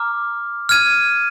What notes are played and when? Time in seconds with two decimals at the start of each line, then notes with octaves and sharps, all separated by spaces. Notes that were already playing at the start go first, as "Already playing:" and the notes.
Already playing: A#5 D6 F6
0.69 F6 G#6 D#7